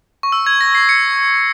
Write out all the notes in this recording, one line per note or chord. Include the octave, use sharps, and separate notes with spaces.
C#6
E6
G#6
A#6
C7
C#7